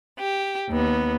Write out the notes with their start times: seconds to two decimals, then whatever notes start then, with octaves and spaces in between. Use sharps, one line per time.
0.19 G4
0.68 D#2 B3